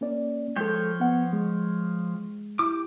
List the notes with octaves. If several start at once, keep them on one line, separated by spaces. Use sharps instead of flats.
A#3 C#4 D5
F3 G#3 A4 C#5 G5
B3 F#5
G#3
E4 G4 D6